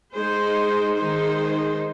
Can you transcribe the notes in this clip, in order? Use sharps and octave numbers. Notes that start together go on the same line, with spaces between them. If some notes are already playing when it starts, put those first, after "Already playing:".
G#3 D#4 G#4 C5
D#3 G#3 D#4 G#4 C5